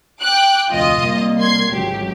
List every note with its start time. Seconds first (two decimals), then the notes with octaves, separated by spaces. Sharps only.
0.21 G5 D6 F#6
0.69 F1 D2 F4 D#5
1.00 C3 G3 A#3
1.39 C6 G#6 C7
1.72 G#1 C#2 F#3 G4